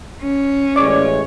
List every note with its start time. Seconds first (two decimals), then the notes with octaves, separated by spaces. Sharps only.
0.22 C#4
0.76 A1 G#3 C#5 D5 D6